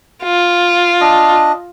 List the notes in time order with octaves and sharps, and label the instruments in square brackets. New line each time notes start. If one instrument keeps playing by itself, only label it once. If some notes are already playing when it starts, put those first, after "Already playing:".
[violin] F4
[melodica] D4 D#5